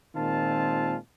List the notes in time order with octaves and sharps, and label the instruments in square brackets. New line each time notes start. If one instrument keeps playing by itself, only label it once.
[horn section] A#2 D#3 G#3 C4 F4 A5